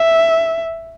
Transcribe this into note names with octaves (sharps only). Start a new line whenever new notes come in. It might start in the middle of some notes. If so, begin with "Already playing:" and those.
Already playing: E5